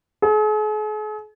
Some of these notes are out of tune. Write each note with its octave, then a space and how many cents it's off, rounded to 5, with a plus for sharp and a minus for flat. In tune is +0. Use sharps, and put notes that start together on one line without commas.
G#4 +45